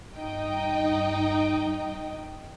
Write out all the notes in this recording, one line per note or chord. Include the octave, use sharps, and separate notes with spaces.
G2 D#4 D#5 G5